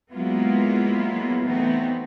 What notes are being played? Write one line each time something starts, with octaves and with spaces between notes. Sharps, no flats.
F#3 G#3 A#3 B3 E4 F4
E3 F#3 A3 B3 C4 D#4